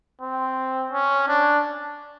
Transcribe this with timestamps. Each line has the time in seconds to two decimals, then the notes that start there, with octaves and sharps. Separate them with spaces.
0.21 C4
0.92 C#4
1.28 D4